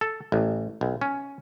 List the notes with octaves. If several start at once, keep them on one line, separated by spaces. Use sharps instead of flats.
A4
A1
B1
C#4